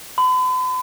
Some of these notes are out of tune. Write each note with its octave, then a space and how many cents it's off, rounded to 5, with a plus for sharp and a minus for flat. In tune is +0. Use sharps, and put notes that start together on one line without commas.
B5 +45